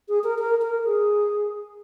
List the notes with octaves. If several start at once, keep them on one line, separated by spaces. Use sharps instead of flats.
G#4
A#4
A#4
A#4
G#4